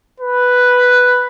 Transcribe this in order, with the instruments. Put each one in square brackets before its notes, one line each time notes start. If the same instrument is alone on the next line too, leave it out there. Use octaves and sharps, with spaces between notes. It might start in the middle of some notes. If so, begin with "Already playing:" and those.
[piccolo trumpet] B4